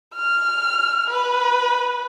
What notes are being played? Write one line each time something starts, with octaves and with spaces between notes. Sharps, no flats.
F6
B4